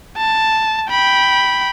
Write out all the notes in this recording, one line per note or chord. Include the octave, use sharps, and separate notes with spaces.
A5
G5 B5